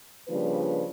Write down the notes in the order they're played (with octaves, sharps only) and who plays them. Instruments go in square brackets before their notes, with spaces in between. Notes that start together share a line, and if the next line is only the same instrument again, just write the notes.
[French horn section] C#3 F3 G3 A#3 D4 B4